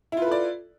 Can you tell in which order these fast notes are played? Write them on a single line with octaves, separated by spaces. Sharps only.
E4 F4 B4 A4 D5